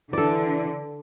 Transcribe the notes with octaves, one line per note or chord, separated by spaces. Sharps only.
D3 E3 A4 D5